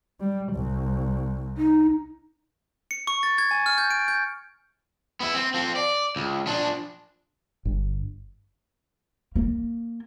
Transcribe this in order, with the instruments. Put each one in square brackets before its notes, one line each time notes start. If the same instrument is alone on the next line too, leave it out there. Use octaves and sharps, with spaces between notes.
[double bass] G3
C2
[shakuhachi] D#4
[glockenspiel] C#7
C#6
A6
G#6
G#5
F6
G6
D7
G6
[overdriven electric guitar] B3 E4
C4
F3 C4
D5
C#2
F3 D4
[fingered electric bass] G1
[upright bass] A#3